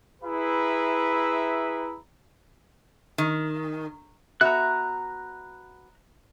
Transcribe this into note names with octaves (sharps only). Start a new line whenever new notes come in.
E4 G#4 B4 E5 A#5 B5
D#3
B3 F#4 E5 A#5 F#6